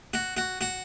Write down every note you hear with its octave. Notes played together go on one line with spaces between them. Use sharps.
F#4
F#4
F#4